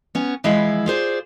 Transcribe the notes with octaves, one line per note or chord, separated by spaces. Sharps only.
B3 C#4
E3 F3 G#3 E4 E5 F5
F4 G#4 C5 D5